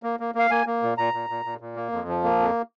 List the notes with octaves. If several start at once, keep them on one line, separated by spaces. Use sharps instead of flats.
A#3
A#3
A#3 F5
A#3 G#5
A#3
A#2
A#2 A#5
A#2
A#2
A#2
A#2
A#3
F2
F3
A#3
F2